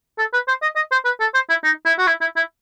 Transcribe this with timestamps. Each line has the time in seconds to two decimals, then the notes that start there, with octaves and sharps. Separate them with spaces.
0.18 A4
0.33 B4
0.48 C5
0.62 D#5
0.76 D#5
0.91 C5
1.05 B4
1.20 A4
1.34 C5
1.49 E4
1.64 D#4
1.85 E4
1.98 F#4
2.07 E4
2.21 E4
2.36 E4